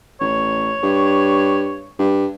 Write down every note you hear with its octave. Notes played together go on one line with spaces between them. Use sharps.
A1 C#5
G2
G2